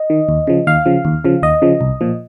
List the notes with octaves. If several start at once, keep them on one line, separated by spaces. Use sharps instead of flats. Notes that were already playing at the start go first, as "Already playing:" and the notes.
Already playing: D#5
D#3
D#2
C#3 F3
D#2 F5
C#3 F3
D#2
C#3 F3
D#2 D#5
C#3 F3
C2
A#2 F3